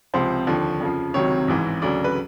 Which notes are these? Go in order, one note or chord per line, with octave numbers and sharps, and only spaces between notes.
C#2 C3 F3 C5
D#2 D3 F3
F2 C#3 F3
C#2 C3 D#3 F#3 C#5
A1 G#2 E3
D2 C#3 F#3 D5
B4